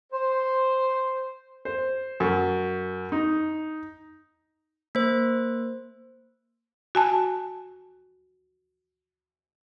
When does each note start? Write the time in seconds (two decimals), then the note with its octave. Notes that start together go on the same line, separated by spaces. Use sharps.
0.12 C5
1.65 C5
2.20 F#2
3.12 D#4
4.95 A#3 C5
6.95 F#4 G#5 A5